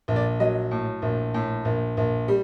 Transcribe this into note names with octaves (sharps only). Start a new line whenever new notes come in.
A#1
D5
F#3 D#5
A2
A#1
A2
A#1
A#1
G3